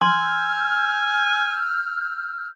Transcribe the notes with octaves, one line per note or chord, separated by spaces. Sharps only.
G#5 C6 E6 F6 G6